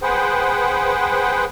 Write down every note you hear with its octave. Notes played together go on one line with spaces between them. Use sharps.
G#4 B4 C5 F#5 G5